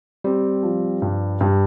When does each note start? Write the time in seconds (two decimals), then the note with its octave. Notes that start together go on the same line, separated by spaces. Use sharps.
0.24 G3 C4
0.63 F3
1.02 G2
1.41 G2